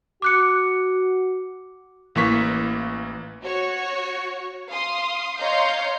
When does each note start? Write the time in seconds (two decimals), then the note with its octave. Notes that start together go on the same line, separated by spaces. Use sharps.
0.22 F#4 D6 F#6 C#7
2.15 A1 E3 A#3 C#6 B6
3.43 F#4 C#5 C#6
4.71 F5 C6 D#6
5.39 C#5 D#5 F5 A#5 C6 G6